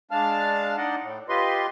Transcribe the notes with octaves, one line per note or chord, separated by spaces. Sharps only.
G#3 D4 F5 A5 F6
D4 D#4 D5 D#5 F#5
A2
F4 G4 B4 D#5 C6